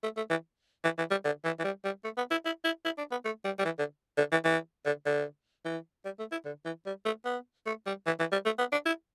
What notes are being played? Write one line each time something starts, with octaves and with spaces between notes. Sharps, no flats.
A3
A3
E3
E3
E3
G3
D3
E3
E3
G3
G3
A3
B3
E4
E4
E4
E4
D4
B3
A3
G3
G3
E3
D3
D3
E3
E3
D3
D3
E3
G3
A3
E4
D3
E3
G3
A3
B3
A3
G3
E3
E3
G3
A3
B3
D4
E4